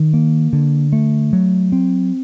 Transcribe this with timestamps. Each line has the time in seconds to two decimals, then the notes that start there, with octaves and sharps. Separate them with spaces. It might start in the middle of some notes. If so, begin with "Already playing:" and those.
Already playing: D#3
0.14 A#3
0.53 D3
0.93 A3
1.33 F#3
1.72 C4